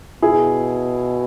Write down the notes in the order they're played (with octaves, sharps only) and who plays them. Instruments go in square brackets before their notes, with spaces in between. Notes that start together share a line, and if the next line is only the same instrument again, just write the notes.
[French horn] B2 [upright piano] E4 G#4